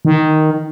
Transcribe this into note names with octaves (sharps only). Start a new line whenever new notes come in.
D#3